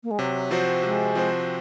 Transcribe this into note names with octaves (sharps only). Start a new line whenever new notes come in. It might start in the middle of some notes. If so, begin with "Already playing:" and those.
A#3
G#3
C3 F#3
F3 C4 F#4 C5
C3 G#3
F3 C4 F#4 C5